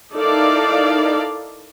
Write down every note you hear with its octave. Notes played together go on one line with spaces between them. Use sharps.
D#4 E4 A4 A#4 D5 F5